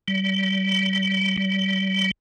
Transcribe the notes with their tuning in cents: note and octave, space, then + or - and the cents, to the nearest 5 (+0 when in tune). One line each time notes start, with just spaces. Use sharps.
G3 -35
G3 -35